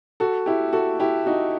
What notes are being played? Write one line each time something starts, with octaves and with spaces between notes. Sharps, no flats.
F#4 A4
E4 G4
F#4 A4
E4 G4
D#4 F#4